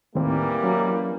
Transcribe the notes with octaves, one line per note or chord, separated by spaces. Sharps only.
D#2 A2 E3 G3 A#3 C4
F#3 C#4